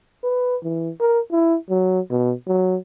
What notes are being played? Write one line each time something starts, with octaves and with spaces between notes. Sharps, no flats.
B4
E3
A#4
E4
F#3
B2
F#3